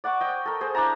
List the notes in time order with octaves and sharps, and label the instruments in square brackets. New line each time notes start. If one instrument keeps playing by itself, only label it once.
[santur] D5 F#5 C#6 D6
D#5 G5 C#6
A4 A#4
G#4 C5
D4 E4 A5 A#5